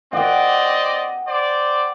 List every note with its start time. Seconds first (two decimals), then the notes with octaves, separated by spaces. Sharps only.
0.13 C4 D5 D#5 F#5 G5
1.26 C5 D5